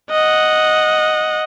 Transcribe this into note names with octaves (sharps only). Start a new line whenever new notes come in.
D#5 F#5